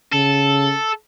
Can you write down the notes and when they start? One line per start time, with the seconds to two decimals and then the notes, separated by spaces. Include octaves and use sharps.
0.13 C#3 A4